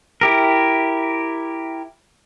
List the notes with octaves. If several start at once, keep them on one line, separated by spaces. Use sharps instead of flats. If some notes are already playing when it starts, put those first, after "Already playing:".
E4 G4 A#4